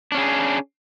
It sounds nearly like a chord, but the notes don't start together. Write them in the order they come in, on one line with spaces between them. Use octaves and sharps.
D4 C#4 G#4